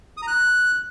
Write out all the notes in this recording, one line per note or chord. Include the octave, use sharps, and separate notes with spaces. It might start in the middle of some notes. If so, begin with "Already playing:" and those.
D#6
A#5
F#6